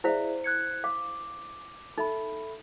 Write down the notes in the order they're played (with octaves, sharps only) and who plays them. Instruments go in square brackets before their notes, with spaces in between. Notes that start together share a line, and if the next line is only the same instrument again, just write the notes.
[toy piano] E4 C5 F5 [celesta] G#4 D5 E5
[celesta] F#6 G#6 C#7
[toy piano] F5 [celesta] D6
[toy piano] D#4 [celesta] A4 E5 B5